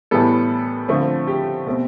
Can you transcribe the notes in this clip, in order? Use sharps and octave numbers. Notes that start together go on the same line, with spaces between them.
A2 E3 G3 B3 A4
D3 F3 A3 C4
G4
B2 A3 C4